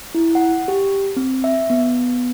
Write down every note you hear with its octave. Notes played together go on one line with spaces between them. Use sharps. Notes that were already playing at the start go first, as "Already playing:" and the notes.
E4
F#5
G4
C4
E5
B3